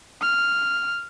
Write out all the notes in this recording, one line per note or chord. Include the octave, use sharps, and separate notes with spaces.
F6